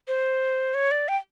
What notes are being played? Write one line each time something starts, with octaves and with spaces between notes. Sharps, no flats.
C5
C#5
D5
G5